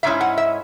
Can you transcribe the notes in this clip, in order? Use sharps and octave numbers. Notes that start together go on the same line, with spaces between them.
G#2 G#3 C#4 E4 E5
F#5
E5